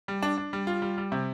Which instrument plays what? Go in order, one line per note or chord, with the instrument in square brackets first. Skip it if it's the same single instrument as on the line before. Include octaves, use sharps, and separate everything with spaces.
[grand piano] G3
D4
D4
G3
F4
G3
G3
C3